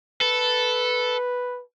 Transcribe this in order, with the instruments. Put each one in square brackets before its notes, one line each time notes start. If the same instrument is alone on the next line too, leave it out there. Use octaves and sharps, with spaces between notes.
[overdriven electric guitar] A4 [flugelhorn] B4